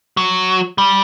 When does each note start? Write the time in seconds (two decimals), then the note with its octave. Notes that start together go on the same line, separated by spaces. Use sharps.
0.17 F#3
0.78 G3